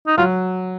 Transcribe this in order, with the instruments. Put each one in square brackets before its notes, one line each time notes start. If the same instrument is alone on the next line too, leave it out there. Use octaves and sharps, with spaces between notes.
[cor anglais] D#4
[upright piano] F#3 [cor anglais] F4